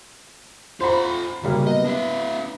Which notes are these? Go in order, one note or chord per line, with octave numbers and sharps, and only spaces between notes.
F4 C5 F#5 A#5 B5
D2 C#3 F#3 G3 A#3
B3 D#5
D4 E4